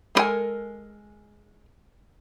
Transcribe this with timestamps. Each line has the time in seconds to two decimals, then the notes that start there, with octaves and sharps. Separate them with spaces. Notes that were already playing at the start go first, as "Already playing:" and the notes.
0.15 G#3 C#4 A4 A#4 G#5